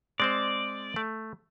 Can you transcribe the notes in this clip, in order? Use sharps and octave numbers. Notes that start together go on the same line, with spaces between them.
G#3 C4 C5 D5
A3